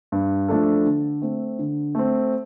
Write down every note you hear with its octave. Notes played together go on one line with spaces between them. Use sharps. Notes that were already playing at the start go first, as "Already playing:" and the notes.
G2
F3 A3 D4 A4
D3
A3 C4
D3
A3 C4